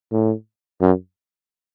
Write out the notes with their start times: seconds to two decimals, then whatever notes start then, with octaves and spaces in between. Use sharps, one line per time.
0.11 A2
0.81 F#2